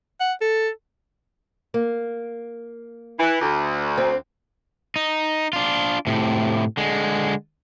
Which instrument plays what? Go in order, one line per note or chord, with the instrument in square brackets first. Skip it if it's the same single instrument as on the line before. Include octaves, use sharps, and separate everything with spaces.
[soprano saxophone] F#5
A4
[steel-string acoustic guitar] A#3
[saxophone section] E3
D2
[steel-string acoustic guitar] C4
[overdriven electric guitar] D#4
D4 F4
A2 C3
D3 G#3